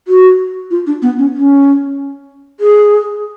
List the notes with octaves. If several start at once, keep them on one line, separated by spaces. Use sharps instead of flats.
F#4
F4
D4
B3
C#4
C#4
G#4